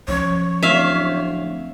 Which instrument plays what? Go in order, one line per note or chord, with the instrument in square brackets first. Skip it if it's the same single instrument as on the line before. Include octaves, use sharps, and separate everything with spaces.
[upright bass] F3 C#4 [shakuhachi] C#5
[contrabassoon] D1 [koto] E5 F5